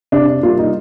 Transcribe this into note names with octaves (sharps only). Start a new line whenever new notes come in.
C3 D4
G3 A#3 F4
D#4